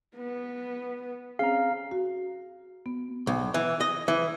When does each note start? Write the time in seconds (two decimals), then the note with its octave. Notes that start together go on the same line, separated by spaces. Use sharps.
0.16 B3
1.39 C4 C#4 G#4 F5 A#5
1.91 F#4
2.86 B3
3.27 B1
3.54 E3
3.81 D#5
4.08 E3